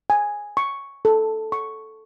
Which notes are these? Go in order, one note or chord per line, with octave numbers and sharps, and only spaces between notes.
G#5
C#6
A4
C#6